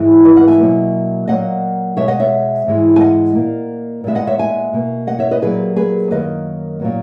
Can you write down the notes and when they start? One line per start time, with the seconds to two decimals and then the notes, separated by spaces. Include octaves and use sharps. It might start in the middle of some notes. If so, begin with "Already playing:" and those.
Already playing: G#2 E3 G#3
0.24 B4 D#5
0.36 D#5 F#5
0.48 E5 G#5
0.59 B2 F#3 A#3
1.28 A#2 F#3 A#3 D#5 F#5
1.97 B2 G#3 B3 C#5 E5
2.08 D#5 F#5
2.19 C#5 E5
2.67 G#2 E3 G#3
2.96 G#5
3.00 D#5 F#5
3.35 A#2 A#3
4.04 A#2 G#3 B3 E5
4.15 D#5 F#5
4.27 C#5 E5
4.38 E5 G#5
4.73 B2 A#3
5.07 D#5 F#5
5.19 C#5 E5
5.31 B4 D#5
5.42 A#2 F#3 A#3 G#4 B4
5.76 G#4 B4
6.11 F#2 D#3 A#3 B4 D#5
6.80 A#2 F#3 B3